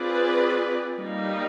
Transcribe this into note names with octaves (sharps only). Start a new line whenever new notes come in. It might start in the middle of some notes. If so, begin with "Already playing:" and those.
Already playing: C4 F4 G#4 B4 D5
G3 A#3 D#4